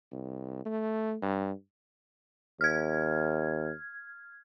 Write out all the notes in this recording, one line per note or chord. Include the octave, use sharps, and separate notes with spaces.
C2
A3
G2
D#2 F6 G#6